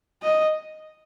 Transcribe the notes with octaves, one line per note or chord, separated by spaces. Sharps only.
D#5